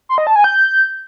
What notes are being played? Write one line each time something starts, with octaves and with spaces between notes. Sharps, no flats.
C6
D#5
A5
G#5
G6